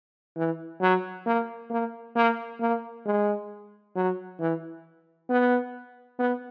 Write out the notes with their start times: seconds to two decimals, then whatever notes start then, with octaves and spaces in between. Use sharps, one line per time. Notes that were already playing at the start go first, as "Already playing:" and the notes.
0.37 E3
0.81 F#3
1.26 A#3
1.70 A#3
2.16 A#3
2.60 A#3
3.06 G#3
3.96 F#3
4.40 E3
5.30 B3
6.19 B3